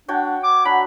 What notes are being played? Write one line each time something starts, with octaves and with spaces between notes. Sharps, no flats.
D4 F#4 C#5 G5
D6
F#3 D4 B5